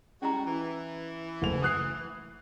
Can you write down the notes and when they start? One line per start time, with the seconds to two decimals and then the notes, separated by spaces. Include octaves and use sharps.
0.22 G3 G#3 C#4 E4 F#4 A#5
0.46 E3
1.42 F#1 A3 F7
1.62 D#6 F#6 C7